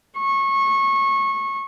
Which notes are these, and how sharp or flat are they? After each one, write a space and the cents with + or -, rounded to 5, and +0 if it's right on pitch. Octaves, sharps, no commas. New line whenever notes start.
C#6 -25